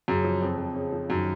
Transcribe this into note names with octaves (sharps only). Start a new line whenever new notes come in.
F#2 C#3
F3
F2
F2
C#3
F3
F#2 D#3